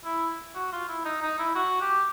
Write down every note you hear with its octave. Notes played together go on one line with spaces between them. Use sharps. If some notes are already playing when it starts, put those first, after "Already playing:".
E4
F#4
F4
E4
D#4
D#4
E4
F#4
G4